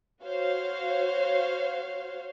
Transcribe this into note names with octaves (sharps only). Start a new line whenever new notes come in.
F#4 C5 C#5 F5